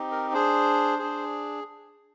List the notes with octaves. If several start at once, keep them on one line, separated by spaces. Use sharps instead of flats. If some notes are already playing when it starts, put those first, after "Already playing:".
Already playing: C4 D#4 G4
A#4
D4 G#4 C5
D4 G#4